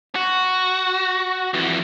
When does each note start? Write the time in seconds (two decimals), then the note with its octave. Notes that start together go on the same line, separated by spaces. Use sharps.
0.15 F#4
1.54 F2 E3